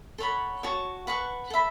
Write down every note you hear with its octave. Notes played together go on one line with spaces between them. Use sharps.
A4 C#5 F#5 B5
F#4 C#5 A5 C#6
B4 F#5 A5 C#6
A4 E5 B5